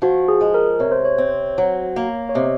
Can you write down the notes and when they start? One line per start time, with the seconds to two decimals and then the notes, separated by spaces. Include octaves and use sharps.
0.02 F3 F#4
0.28 G#4
0.41 G#3
0.54 A#4
0.80 C3 C#5
0.92 C5
1.05 C#5
1.18 C4
1.58 F#3
1.96 A#3
2.29 C#5
2.35 C3 D#5